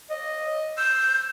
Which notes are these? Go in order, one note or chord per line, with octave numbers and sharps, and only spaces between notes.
D#5
E6 G6